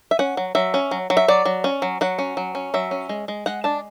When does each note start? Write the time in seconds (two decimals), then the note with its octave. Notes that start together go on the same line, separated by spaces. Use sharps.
0.11 E5
0.19 C#4 F#5
0.37 F#3
0.55 F#3 E5
0.74 C#4
0.91 F#3
1.10 F#3
1.17 E5
1.28 F#3 D5
1.46 F#3
1.64 C#4
1.82 F#3
2.01 F#3 F#5
2.19 C#4
2.37 F#3
2.55 C#4
2.74 F#3 E5
2.91 C#4
3.09 G#3
3.28 G#3
3.46 G#3 F#5
3.64 D4 A5